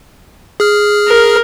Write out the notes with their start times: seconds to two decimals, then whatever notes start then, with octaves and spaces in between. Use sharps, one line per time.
0.60 G#4 F6
1.07 A#4